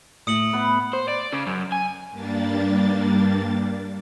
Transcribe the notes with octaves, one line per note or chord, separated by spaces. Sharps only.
A2 D#6 C#7 F#7
B3
C5
D5
C#3
F#2
G#5
G2 G3 A#3 D4 A6